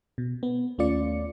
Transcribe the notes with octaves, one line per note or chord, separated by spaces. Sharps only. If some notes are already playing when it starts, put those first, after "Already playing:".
B2
B3
D#2 A3 C#4 F4 D5 C#7